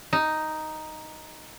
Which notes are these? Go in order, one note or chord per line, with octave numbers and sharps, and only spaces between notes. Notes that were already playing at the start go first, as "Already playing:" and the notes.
D#4